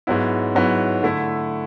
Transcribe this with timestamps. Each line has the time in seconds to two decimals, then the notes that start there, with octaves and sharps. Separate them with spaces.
0.07 G#2 F#3 B3 E4
0.55 G#2 F#3 B3 E4
1.03 D3 A3 E4